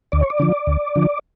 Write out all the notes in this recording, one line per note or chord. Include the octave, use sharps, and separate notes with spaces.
D2 D5
C#5
D5
D3 F3
D2
D3 F3